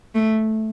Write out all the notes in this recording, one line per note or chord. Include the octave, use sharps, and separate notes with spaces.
A3